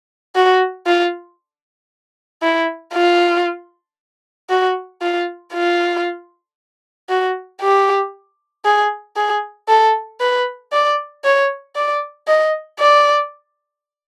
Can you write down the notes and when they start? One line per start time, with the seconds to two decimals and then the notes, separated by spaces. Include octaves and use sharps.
0.35 F#4
0.87 F4
2.43 E4
2.94 F4
4.50 F#4
5.02 F4
5.54 F4
7.09 F#4
7.61 G4
8.65 G#4
9.16 G#4
9.68 A4
10.20 B4
10.72 D5
11.24 C#5
11.76 D5
12.28 D#5
12.79 D5